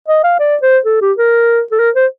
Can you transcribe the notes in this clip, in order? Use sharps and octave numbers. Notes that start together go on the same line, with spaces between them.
D#5
F5
D5
C5
A4
G4
A#4
A4
A#4
C5